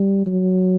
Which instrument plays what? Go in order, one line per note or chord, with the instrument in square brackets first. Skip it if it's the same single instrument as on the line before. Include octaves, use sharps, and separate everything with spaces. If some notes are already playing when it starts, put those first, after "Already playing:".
Already playing: [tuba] G3
F#3